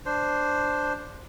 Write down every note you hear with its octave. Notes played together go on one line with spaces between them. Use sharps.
D4 C5